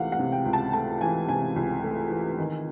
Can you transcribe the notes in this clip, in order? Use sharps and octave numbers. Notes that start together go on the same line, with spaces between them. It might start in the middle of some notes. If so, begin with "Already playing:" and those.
Already playing: C#2 C3 E3 A3 F5 F#5
F#5
C3
G5
C#2
A5
A3 A5
E3 G#5
C3 G#5
C#2
A3
E3
D#3